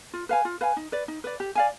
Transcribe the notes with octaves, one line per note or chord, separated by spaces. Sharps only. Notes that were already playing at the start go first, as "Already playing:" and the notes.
F4
B4 F5 G#5
F4
B4 F5 G#5
D#4
B4 D5
D#4
B4 D5
G4
D5 F5 G#5